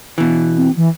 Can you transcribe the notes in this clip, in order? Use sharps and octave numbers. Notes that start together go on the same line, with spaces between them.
B2 E3
C4
E3